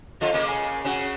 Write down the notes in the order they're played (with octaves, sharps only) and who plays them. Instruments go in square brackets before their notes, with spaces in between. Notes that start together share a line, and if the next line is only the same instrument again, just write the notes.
[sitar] F3 F4 A4 [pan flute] D#5
[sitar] C#3 A#3 C#4
[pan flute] G#5
[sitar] C#3 C#4 F#4